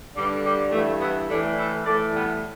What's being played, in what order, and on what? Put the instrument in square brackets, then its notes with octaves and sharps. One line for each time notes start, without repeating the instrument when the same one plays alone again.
[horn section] G2 D3 G3
G3
G2 E3 A3
B3 E4
A2 E3 A3 D4
E4 A4
A2 A4 D5
E3
G3 B3